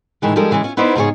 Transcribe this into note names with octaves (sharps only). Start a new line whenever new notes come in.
A2 C3 D#3 E3 G#3
F3 G3 G#3 C#4 A4 A#4
C#3 E3 G#3 C#4
C#4 F4
B3 D#4 E4 B4 C5 D5
G#2 C#3 C#4 E4 G#4 C#5